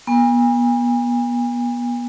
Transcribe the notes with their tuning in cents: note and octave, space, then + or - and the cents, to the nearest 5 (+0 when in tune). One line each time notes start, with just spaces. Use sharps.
B3 -35 G#5 -40